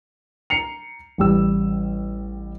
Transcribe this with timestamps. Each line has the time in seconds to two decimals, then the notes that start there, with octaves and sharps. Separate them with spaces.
0.50 A#5 C7 C#7 F7
1.18 A1 G3 E6